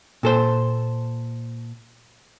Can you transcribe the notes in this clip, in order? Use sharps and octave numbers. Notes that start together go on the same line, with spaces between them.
A#2 A4 C5